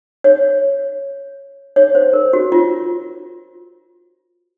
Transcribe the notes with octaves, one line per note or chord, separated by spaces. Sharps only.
C#5
C#5
C5
A#4
F#4
F4